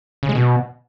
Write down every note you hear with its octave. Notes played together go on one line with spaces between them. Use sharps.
C#3
G#3
B2